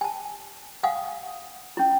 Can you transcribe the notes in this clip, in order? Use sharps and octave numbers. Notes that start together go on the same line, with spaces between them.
G#5 A5
F5 F#5 G#5 D#6
C#4 E4